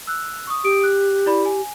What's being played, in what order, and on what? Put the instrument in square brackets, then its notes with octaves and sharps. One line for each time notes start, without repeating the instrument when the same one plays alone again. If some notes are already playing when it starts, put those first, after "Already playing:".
[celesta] E6 F#6
C#6 D#6
[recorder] G4 [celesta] D#6 D7
[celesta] F#6
E4 D5 B5
G#5